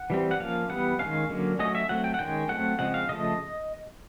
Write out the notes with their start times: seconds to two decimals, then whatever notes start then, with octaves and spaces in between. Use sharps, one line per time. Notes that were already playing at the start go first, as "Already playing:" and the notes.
Already playing: F#5
0.10 E3 G3 C4
0.31 F#5
0.39 F3 A#3 C#4 F5
0.70 E3 G3 B3 F#5
0.99 D#3 G#3 C#4 F5
1.29 D3 F#3 A#3 C#4
1.59 F#3 A3 C#4 D#5
1.75 E5
1.89 F#3 A3 C4 F#5
2.04 G5
2.14 F#5
2.19 D#3 G#3 C#4 G5
2.49 F#3 A3 C4 F#5
2.79 C#3 F3 G#3 C4 F#5
2.94 F5
3.09 C#3 F3 A3 D#5